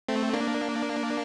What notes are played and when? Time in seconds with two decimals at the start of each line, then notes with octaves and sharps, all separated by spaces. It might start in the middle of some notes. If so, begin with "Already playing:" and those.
0.09 A3 C4
0.33 A#3 D4